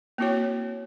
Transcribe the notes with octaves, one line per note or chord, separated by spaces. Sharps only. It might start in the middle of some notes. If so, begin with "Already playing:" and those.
A#3 C4 E4 F#4 C#5